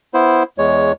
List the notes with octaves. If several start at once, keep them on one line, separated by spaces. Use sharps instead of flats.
B3 E4 C5
E2 G#3 C#5